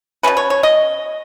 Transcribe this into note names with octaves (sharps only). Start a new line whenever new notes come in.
B2 G#3 C#4 B4
C#5
C#5
D#5